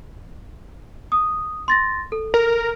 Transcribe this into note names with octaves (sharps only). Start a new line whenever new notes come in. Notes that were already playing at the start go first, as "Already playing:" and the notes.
D#6
C6 A6 A#6
A4
A#4